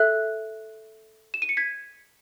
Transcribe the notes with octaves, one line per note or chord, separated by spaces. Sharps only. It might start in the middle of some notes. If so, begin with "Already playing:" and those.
Already playing: A4 E5 F#6
E7
D#7
C#7
G#6 B6